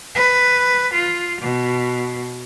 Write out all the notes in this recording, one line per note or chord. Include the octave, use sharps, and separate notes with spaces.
B4
F4
B2